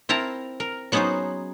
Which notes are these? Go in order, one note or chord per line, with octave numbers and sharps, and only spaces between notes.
C4 E4 A#4 A5 A#5
A#4
F#3 B3 C#4 D#4 G#4 C5